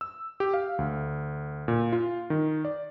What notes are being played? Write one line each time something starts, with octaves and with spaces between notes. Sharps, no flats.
E6
G4
F5
D2
A#2
F4
D#3
D5